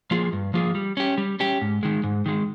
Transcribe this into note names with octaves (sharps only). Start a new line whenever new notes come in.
F3 A#3 F4 G#4
G2
F3 A#3 F4 G#4
G3
C#4 G4
G3
C#4 G4
G#2
D#3 G#3
G#2
D#3 G#3